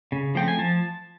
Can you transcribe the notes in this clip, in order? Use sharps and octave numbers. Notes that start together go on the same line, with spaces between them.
C#3
F3 A3 C4 G5
G#5
F3 A5